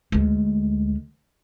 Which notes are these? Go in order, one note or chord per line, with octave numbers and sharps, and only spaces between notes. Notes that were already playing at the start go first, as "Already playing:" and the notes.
D2 G#3